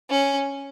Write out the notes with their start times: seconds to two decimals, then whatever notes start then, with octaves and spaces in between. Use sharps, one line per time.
0.10 C#4